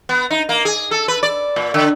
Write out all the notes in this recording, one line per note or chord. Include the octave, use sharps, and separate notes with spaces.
B3
D#4
A#3
G#4
A4
B4
D5
A#2
D3